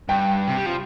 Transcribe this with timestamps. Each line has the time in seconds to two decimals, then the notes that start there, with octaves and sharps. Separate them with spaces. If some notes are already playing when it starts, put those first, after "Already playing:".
0.09 G2 G5
0.47 C3
0.57 G3
0.66 F3